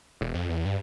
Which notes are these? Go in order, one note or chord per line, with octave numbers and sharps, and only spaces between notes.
E1
F2
E2
G2